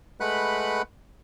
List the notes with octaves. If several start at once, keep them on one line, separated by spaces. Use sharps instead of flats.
G#3 A3 B4 F#5 B5 F#6